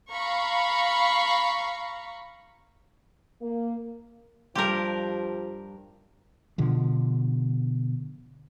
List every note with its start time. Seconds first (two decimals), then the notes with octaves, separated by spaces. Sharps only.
0.12 F5 A#5 B5 C#6
3.41 A#3
4.55 G2 F3 G4 A#4 C6 G6
6.58 B2 D3 F3